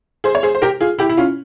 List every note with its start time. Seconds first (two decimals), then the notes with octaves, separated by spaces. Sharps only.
0.24 G#4 C5
0.35 C#5
0.43 G#4 C5
0.55 C5
0.62 G4 A#4
0.81 F4 G#4
0.99 E4 G4
1.09 E4
1.17 C#4 F4